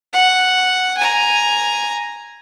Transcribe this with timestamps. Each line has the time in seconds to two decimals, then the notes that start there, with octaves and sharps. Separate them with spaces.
0.13 F#5
0.98 G#5 A#5